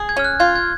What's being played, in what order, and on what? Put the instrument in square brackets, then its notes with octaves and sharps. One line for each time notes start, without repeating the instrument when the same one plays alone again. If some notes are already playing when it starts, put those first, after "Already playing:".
Already playing: [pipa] G#4
[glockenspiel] G#6
[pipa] C#4 [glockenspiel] F6
[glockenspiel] F#6
[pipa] F4 [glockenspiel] G#6
[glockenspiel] G#6